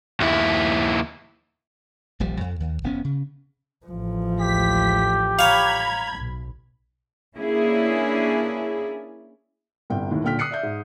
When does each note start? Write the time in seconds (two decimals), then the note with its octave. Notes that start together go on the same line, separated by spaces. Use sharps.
0.21 D#2 E4
2.20 D#1 A#1 F3 G3
2.40 F2
2.60 D#2
2.84 F1 B3 C#4
3.04 C#3
3.86 A1 F3
4.40 D2 G#3 G4 B6
5.39 C#5 F5 A#5 B5 G#6
6.18 B1
7.36 A#3 C#4 D4 E4 G#4
9.90 G1 C2 G5
10.11 D#2 A2 D#3
10.24 D#1 A#2 D3 G5 F6 B6
10.39 D#6 F#6 C7 C#7
10.51 D5 E5 G6
10.63 G#2